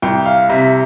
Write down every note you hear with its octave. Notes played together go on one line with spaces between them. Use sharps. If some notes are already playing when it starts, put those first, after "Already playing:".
C2 G5
F5
C3 E5